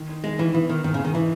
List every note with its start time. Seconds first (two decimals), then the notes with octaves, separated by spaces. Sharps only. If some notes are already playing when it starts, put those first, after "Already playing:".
Already playing: D#3
0.09 D#4
0.24 D#3 G#3
0.39 D#3 E3
0.54 E3 B3
0.69 D#3 B3
0.84 G#2 D#3
0.94 C#3
0.99 G#2
1.05 D#3
1.14 E3 D#4